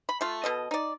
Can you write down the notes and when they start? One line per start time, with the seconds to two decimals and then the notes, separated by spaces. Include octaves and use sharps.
0.09 B5
0.21 A3 F4
0.44 B2 A4 D#5
0.71 D#4 D5